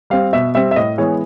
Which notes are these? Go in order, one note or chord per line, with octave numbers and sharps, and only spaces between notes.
G3 C4 F5
B2 E5
G3 C4 E5
E5
A2 D#5
E3 G#3 B3 C#5